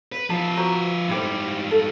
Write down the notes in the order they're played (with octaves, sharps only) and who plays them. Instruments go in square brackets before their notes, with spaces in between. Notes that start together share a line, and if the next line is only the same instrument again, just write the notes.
[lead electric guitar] B4
[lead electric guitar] F3 B4 [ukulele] A5
[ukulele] F#4 C5 A#5
[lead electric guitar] G#2 G3 [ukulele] E4 G4 C5
[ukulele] A4